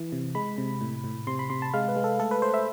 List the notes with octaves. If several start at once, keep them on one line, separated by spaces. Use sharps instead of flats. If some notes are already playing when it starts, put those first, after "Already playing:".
Already playing: E3
C3
G#3 B5
C3
A2
A2
C3 C6
B5
C3 C6
A5
G#3 F5
B4
G#3
A4
A3 A4
B4
A3 C5
E5